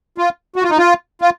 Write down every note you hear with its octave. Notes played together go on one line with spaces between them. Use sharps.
F4
F#4
F4
D#4
F4
F4